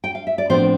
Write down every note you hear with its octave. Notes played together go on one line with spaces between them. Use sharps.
G5
F5
E5
D5
A2 F3 B3 C4 D4 C5